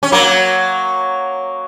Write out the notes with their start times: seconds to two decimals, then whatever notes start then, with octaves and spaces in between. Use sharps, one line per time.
0.03 C#4
0.12 F#3 A#3